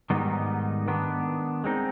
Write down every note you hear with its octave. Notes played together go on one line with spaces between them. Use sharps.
G#2 D#3 G3 B3 D#4
D#3 B3 D4
G#3 C4 D#4